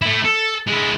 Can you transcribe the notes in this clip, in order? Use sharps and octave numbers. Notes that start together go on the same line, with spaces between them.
A3 E4
A4
G#3 E4